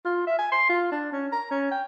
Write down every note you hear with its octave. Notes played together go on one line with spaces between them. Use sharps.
F4
E5
G#5
C6
F4
D4
C#4
A#5
C#4
G5